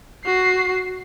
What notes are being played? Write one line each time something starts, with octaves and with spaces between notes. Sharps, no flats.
F#4 C7